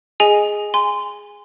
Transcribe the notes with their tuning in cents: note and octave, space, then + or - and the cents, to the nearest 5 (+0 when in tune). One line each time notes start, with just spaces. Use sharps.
G#4 +0 D#5 +0 G#5 +0
G#5 -20 C6 -25